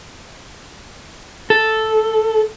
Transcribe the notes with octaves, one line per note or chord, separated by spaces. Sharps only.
A4